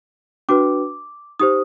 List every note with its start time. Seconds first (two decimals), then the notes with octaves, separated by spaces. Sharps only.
0.49 D4 F#4 B4 D6
1.40 D#4 G4 C5 D#6